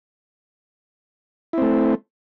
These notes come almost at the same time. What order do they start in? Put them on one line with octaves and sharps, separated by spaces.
E4 C4 A3